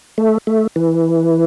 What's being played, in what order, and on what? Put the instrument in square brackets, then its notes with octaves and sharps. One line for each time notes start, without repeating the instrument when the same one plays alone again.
[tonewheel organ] A3
A3
E3